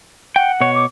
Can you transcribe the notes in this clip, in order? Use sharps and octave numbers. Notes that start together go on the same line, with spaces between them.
F#5 G5
B2 C#5
D6